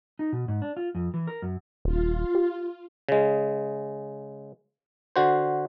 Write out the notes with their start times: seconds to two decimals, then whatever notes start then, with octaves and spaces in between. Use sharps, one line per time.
0.19 D#4
0.33 B2
0.48 G#2
0.62 D4
0.77 F4
0.95 F2
1.14 E3
1.27 A#4
1.42 F#2
1.85 D#1 F4
2.35 G4
3.09 C#3 G#3
5.16 D3 F#4 C5